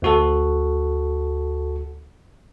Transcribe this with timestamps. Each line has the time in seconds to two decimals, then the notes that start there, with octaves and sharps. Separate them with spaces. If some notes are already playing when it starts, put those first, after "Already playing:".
0.02 D2 F#4 A4